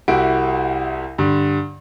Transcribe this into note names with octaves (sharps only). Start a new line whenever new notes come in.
C2 E4 F#4 G4 D7
G2 D3